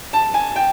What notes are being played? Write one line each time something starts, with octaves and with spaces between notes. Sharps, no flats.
A5
G#5
G5